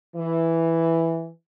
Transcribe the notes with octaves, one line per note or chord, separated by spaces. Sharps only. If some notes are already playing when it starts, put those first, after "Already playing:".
E3